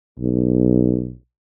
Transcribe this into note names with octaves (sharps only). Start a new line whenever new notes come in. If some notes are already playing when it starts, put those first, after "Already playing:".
B1